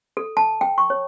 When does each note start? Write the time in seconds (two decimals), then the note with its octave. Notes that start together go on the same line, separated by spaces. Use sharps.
0.17 A4
0.37 A5
0.61 G5
0.78 C#6
0.90 C#5